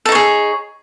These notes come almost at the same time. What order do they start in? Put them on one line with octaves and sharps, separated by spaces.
A4 D#4 C#5 G#4